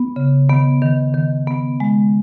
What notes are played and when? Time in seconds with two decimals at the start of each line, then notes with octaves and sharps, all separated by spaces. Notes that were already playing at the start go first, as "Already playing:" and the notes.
Already playing: B3
0.16 C#3
0.49 D#3 B3
0.82 D#3
1.14 D#3
1.47 B3
1.80 G#3